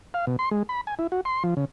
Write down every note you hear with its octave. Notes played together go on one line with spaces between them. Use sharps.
F5
B2
C6
G#3
B5
G#5
E4
F#4
C6
F3
C#3